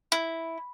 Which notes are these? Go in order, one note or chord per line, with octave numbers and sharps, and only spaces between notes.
E4